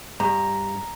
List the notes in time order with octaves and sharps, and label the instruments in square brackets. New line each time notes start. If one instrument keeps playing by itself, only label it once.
[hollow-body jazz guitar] G2 [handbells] A#5